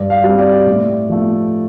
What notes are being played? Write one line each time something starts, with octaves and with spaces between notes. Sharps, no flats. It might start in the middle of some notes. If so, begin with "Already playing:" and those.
Already playing: G2 D5
F5
G3 C4
D5 G5
A2
F3 A3